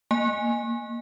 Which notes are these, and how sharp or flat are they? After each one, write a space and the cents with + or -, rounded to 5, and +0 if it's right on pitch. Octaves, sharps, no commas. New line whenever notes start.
A#3 +0 G#5 -5